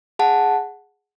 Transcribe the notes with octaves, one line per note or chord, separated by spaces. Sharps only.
G#4 F#5 A5